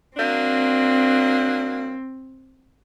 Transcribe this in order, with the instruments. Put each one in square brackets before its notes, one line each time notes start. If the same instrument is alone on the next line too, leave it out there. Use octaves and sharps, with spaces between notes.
[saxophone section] F#3 A#3 D4 [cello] C4